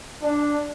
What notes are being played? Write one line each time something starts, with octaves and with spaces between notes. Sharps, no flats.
D4